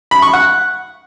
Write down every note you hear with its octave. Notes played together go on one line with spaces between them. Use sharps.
B5
C#6
F#5